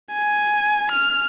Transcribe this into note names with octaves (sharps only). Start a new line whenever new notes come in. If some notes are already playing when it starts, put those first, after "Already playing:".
G#5
F6